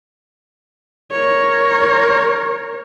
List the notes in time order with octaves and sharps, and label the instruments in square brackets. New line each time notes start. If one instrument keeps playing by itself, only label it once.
[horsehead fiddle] A#4 C#5